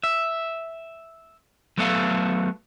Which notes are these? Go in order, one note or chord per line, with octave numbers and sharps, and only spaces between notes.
E5
F#3 A3 B3 A4 E5 F5